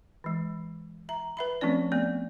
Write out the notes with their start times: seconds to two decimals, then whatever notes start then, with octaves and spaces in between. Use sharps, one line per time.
0.24 E3 G#3
1.09 E5 A#5
1.37 B4 E5 B5
1.61 F3 A3 C4 C#4 D5
1.92 A3 B3 D5